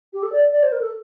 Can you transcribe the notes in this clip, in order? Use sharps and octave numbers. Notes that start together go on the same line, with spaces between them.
G4
A4
D5
D5
C5
A#4
A4